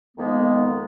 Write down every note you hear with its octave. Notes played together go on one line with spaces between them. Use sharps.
F2 D#3 G#3 A#3 B3